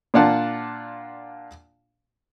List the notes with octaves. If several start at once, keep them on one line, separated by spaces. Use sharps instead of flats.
A#2 D4 F4 F#5 A5